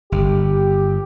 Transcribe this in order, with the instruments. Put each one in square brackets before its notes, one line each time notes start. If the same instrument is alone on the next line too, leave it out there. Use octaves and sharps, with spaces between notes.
[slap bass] G1 [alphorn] G4